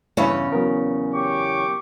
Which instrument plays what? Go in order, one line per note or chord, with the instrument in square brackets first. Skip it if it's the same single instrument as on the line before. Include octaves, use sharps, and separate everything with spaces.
[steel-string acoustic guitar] E2 C#3 C#4 [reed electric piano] G2 E4 B5
[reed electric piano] F#3 B3 A#4
[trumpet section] G4 C#6 D6